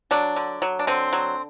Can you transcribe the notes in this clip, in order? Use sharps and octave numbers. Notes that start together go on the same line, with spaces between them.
F#3 D4
D3
F#3
D4
D3 C4
F#3